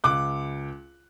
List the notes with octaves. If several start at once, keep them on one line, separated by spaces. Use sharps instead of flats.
C#2 D6 F#6